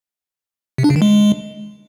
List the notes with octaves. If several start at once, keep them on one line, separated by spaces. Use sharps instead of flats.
C3
D4
C#3
D#3
G#3